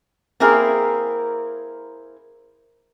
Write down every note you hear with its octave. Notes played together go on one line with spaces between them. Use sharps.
A#3 C4 E4 G#4 A#4